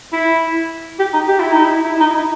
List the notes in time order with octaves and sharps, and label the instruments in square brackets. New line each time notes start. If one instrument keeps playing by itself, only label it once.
[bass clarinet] E4
G4
D#4
G4
E4
D#4
E4
E4
D#4
E4
D#4